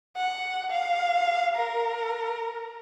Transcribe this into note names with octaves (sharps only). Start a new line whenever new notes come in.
F#5
F5
A#4